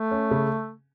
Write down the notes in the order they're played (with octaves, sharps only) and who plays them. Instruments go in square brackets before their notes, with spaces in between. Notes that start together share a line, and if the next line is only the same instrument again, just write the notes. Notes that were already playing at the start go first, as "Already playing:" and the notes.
Already playing: [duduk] A3
[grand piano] C#4
C#3